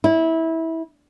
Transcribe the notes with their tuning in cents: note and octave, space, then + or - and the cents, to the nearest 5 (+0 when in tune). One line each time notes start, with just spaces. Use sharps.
E4 -20